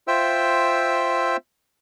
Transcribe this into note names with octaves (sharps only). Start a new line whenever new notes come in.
F4 C5 E5 G5 E6